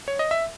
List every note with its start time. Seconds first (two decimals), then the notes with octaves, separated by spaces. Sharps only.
0.08 C#5
0.19 D#5
0.31 E5